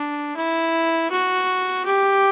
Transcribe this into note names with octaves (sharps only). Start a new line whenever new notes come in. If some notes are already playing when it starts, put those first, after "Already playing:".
Already playing: D4
E4
F#4
G4